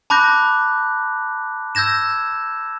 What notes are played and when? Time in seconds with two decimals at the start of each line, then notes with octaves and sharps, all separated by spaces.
0.10 A5 B5 D6 F#6 G6 A#6
1.75 E6 G6 G#6 A#6 E7